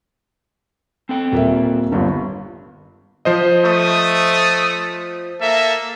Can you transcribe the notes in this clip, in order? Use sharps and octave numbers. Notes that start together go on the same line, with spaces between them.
C4 A4 G5
D#1 A#3 E5
G1 G2 D3
F3 C5 D#5
A3 D#6
A#3 A4 E5